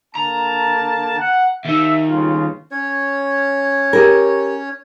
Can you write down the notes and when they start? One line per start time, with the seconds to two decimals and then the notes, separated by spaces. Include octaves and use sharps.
0.15 D3 A#3 A5 A#5
1.19 F#5
1.65 D#2 D#4 E5
2.09 G1 C#3 F4
2.71 C#4 C#5
3.93 G4 A#4